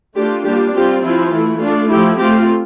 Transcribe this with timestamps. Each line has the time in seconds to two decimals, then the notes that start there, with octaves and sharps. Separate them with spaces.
0.16 A3 D4 F4 G4
0.45 G3 A#3 D4 F4 G4
0.74 G3 C4 F4 G4
1.03 F3 C4 E4 F4
1.32 E3 A3 E4
1.61 A3 D4 F4
1.90 F3 A3 E4 G4
2.19 A3 C4 F4 G4